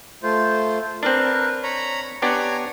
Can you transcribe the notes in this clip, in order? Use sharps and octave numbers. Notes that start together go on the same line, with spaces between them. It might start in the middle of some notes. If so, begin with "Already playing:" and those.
A3 F4 C5
C4 D4 A#4 B4
C#5 A#5 B5
B3 D4 G4 C#5 G#5 A#5